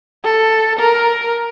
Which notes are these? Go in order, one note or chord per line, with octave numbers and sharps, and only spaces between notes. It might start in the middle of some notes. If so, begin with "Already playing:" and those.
A4
A#4